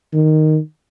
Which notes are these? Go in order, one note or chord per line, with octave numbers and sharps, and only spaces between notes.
D#3